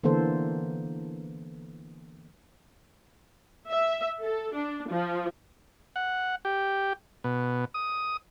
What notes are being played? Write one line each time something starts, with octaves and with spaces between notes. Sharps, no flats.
D3 E3 A#3 B3 A4 C5
E5
A4
D4
F3
F#5
G4
B2
D#6